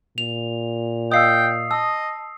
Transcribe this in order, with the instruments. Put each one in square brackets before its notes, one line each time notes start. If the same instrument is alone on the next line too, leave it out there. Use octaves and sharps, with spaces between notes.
[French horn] A#2 [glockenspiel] F7
[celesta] D#5 F5 E6 [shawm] G5 [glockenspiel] D#6 C7
[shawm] D#5 [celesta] A5 [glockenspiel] E6